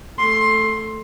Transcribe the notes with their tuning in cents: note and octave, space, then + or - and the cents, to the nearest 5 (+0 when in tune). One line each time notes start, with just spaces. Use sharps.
A3 +0 C6 +15